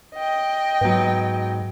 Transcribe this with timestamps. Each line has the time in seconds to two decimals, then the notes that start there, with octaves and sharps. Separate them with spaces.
0.15 D#5 G5
0.81 G#2 F#3 B3